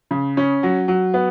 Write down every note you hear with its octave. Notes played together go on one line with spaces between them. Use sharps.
C#3
C#4
F#3
F#3
B3